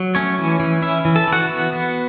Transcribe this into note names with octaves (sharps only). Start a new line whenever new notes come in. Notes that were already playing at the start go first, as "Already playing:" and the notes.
Already playing: F#3
A3 C#4 C#5
E3
E3
C#4 E4 E5
E3
A4 A5
E3
F#4 F#5
B3
B3